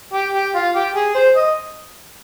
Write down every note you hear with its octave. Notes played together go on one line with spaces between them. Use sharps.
G4
G4
F4
G4
G#4
C5
D#5